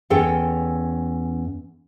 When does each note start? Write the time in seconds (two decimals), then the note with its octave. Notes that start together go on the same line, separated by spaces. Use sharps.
0.10 E2 C#4 A4 G5